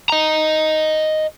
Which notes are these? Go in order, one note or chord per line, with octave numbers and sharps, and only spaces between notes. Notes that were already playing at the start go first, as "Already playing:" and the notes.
D#5 A#5